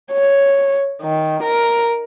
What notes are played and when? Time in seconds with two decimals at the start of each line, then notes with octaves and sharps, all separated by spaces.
0.13 C#5
1.02 D#3
1.43 A#4